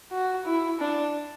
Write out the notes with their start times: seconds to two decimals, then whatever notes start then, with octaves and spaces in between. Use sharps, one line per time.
0.11 F#4
0.46 E4
0.80 D4